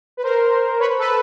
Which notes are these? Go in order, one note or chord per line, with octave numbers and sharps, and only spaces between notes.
B4
A#4 C5
B4 C#5
A4 B4